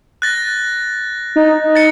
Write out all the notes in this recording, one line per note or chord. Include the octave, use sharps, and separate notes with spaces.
F#6 A6 A#6
D#4
A6 C#7